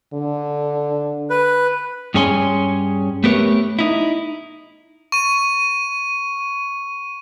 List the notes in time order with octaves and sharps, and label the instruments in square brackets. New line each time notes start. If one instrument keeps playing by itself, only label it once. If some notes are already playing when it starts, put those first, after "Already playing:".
[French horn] D3
[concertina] B4
[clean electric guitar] G2 C#4 G#4 C#5 G#5 C6
A3 B3 G4 A#4 B4 C#5
D#4 E4
[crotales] C#6 D#7